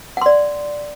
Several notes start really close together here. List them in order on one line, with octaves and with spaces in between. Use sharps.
F#5 C6 D5